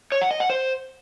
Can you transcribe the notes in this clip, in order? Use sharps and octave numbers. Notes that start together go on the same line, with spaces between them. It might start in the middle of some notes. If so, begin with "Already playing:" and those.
C#5
F#5
D#5
F#5
C5